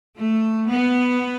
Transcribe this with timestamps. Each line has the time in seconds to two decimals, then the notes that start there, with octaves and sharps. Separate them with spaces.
0.19 A3
0.70 B3